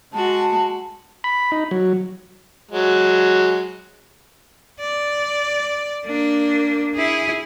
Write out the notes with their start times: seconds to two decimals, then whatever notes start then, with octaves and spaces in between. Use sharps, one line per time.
0.13 G#3 F#4 A5
1.24 B5
1.52 D#4
1.71 F#3
2.71 F#3 G#3
4.81 D5
6.05 A#3 D4
6.95 E4 G#4